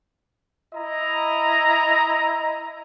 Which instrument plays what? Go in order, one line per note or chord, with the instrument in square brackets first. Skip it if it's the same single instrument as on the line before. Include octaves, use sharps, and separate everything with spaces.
[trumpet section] E4 D#5 A#5